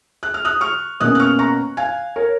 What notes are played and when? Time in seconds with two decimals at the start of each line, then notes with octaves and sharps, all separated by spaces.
0.23 F#6
0.34 F6
0.45 D#6 F#6
0.61 C#6 F6
1.00 B2 A#3 C#4 D#6 F#6
1.15 F#6
1.20 C#6 F6
1.39 A#5 C#6
1.77 F5 G#5
2.16 A#4 C#5